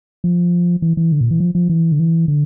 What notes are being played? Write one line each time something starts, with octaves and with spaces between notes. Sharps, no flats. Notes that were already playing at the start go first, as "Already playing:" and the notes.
F3
E3
E3
D3
A#2
E3
F3
F3
E3
D3
E3
D3